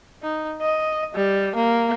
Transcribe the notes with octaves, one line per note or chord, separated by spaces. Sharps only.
D#4
D#5
G3
A#3